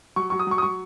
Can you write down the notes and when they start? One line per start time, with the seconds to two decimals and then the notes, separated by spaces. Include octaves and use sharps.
0.16 F#3 C#6
0.30 F#3 C#6
0.39 D#6
0.47 F#3 C#6
0.58 D#6
0.62 F#3 C#6